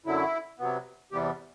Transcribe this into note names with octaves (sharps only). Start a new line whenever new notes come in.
F#2 D3 F#3 E4
C3 F#3 B3
E2 C3 E3 G3 B3 G4